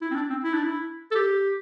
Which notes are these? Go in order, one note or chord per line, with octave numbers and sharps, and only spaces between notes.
E4
C4
D4
C4
E4
D4
E4
A4
G4